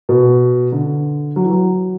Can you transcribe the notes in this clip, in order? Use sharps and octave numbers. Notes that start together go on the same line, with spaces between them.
B2
D3
F#3
E3
F#3